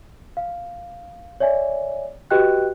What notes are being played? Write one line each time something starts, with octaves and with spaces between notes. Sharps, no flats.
F5
C#5 D5 E5 G#5
F#4 G4 B4 D#5 G5 F#6